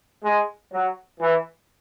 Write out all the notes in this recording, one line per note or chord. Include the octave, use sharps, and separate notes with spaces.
G#3
F#3
E3